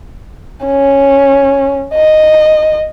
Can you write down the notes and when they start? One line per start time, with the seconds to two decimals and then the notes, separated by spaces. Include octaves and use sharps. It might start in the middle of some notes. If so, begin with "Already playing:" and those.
0.65 C#4
1.95 D#5